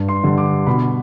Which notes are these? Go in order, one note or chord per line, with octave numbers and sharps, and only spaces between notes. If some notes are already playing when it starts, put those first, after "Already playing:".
Already playing: G2
C6
D3 G3
D6
B2 B5